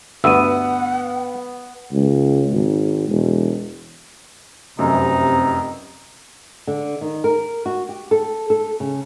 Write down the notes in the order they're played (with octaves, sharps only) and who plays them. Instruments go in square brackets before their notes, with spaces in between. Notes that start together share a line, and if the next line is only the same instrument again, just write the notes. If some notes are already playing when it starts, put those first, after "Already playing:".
[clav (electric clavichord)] D2 G2 [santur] B3 [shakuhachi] F#5 [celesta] E6 D#7
[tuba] C#2
G#1
E1
[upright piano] F1 F#2 [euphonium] C3 [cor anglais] D#4
[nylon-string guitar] D3
D#3
A#4
F#4
G4
A4
A4
C#3